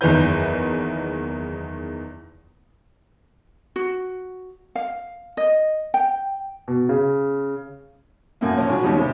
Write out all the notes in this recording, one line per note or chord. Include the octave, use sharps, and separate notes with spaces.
F#1 E2 D#3 E4 B4 G6
F#4
F5
D#5
G5
B2
C#3
F#2 A2 A#3
A#2 F3 C#4
C#3 F#3
D#2 G#2 G3 G#3 B3 C#4
C3 C4 G4